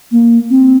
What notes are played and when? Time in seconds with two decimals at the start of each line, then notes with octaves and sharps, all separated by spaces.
0.12 A#3
0.50 C4